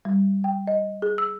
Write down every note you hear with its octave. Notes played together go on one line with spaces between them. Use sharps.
G3
G5
D#5
G#4
E6